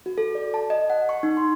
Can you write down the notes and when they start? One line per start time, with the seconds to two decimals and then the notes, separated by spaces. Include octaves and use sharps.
0.06 F#4
0.18 A4
0.35 D5
0.54 A5
0.70 D#5
0.90 F#5
1.09 C#6
1.23 D#4
1.37 C6